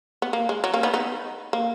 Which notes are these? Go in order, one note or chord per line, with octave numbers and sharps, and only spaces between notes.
B3
A#3
G#3
F#3
A#3 C#4
B3 D#4
B3 D#4
A#3